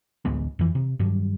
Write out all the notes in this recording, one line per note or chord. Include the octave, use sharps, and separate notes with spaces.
A1 D2 G#3 B3
F2 E3
C3
G2 D#3 F#3 G3